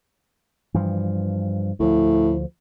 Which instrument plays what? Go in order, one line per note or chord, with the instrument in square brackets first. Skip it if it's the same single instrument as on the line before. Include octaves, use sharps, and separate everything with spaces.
[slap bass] G2 E3 F3
[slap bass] D2 F3 [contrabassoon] A2